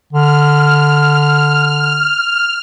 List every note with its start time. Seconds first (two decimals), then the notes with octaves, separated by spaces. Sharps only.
0.13 D3 F6